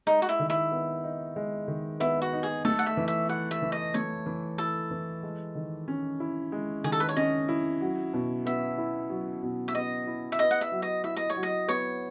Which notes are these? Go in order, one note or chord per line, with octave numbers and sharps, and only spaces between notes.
G#3 D#4
F#4
E4
D#3
E4
B3
D#4
G#3
D#3
B3 E4
F#4
D#4
G#4
A3 A4
F#5
E5
E3
E5
E4 F#5
E5
E3
D#5
A3 C#5
E3
E4 A4
E3
G#3
D#3
C#4
E4
G#3
D#3 G#4
A4
B4
C#5
C#4 D#5
E4
F#3
B2
B3 E5
E4
F#3
B2
E5
B3 D#5
E4
E5
B3 D#5
F#5
E5
F#3
D#5
E4 E5
D#5
C#5
F#3
D#5
B3 C#5